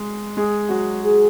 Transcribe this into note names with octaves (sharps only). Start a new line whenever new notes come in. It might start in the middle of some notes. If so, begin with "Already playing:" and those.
Already playing: G#3
G#3 G#4
F#3 F#4
G#4